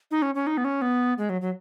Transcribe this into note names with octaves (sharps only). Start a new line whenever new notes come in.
D#4
C#4
C#4
D#4
B3
C#4
B3
G#3
F#3
F#3